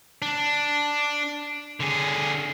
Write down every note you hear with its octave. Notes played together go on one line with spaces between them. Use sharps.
D4
D3 G#4